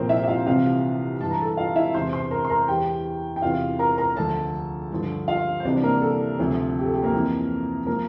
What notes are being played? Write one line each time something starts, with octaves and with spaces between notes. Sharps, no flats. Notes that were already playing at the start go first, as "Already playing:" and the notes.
Already playing: C2 A#2 F3 A#3 C4 A#4 C5
E4 E5
E5
F4 F5
C2 C3 E3 F4 F5
G2 E3 A5
A#5
A4 A5
F4 F5
E4 E5
E2 C3 E3 C5 C6
C5 C6
A#4 A#5
C6
A#4 A#5
E2 E3 G4 G5
G5
E2 C3 E3 F4 F5
A#4 A#5
A#4 A#5
D2 D3 F3 A4 A5
G2 D3 F3
F4 F5
C5
C2 C3 E3 D4 D5
A#3 A#4
A4
D2 C3 F3
G4
A4
G4
A#3 A#4
F2 E3
F3 A#3 A#4